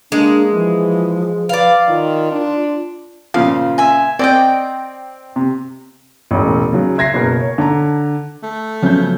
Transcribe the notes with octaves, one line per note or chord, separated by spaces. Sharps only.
G#3 A#3 D4
E3 F3
B4 D5 F5
D#3 F4
D4
A#2 C#3 F3 F5
E5 G#5
C4 D5 D#5 G5
C3
E1 A1
C#3 F#3
E5 G#6 A#6 C7
F#1 B2 A#4
C#5
D3 A5 A#5
A3
C#3 F3 F#3 B3 G6